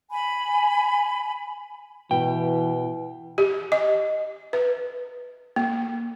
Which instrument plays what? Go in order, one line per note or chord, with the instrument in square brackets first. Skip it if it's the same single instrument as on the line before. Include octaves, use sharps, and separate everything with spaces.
[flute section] G#5 B5
[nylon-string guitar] B2 [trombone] E3 [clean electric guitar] G5
[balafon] G4
D#5
B4
A#3